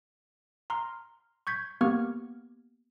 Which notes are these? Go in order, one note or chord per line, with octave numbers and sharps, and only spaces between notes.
A#5 C6 F6
C#6 G6 G#6 B6
A#3 B3 G4 C#6 F6 G#6